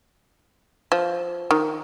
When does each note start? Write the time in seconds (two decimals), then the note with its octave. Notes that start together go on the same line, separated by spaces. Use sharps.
0.92 F3
1.51 D#3